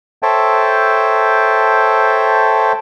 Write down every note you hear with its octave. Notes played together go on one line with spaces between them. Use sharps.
A4 C5 C#5 E5 G5 A5